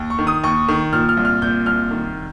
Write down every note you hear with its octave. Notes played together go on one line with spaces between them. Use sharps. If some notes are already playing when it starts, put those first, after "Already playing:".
Already playing: D#2
C#6
D#3
D#6
D#2 C#6
D#3
A#2 F6
F6
C2
F6
A#2 G6
C2 F6
D#3